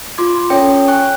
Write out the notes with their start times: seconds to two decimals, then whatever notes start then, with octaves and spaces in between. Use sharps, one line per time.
0.18 F4 C6 D6 G#6
0.50 C#4 A4 C#5 G5 C#7
0.88 G5 G#5 C#6 F#6